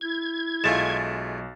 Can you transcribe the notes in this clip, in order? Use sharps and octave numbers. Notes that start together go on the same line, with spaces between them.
E4 G#6
B1 G#3 A3 F4 A6 E7